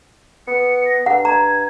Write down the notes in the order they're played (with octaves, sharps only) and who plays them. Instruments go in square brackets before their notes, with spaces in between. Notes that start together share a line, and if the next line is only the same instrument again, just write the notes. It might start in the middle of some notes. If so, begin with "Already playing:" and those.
[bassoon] B3 [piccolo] C#7
[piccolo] A#6
[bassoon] G2 [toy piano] F#5 [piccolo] A#5
[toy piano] A#5 [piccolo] G#6